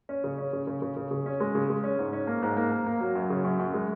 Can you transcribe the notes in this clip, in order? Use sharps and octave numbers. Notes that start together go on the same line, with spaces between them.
C#4
C#3
C#4
C#3
C#3
C#3
C#3
C#3
C#4
G#3
C#3
G#3
C#4
G#2
C#4
A#3
G#2
A#3
A#3
A#3
F#3
F#2
C#3
F#2
F#2
G#3